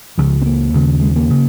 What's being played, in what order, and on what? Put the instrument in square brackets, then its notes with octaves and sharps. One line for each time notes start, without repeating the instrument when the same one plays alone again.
[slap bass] C#2 C#3 F3
C4
A#3
D#2 C#3
G#3
A#3
C#3